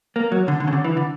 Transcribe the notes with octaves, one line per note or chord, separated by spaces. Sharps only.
A#3
F#3
D3
D3
C#3
D3
E3
D3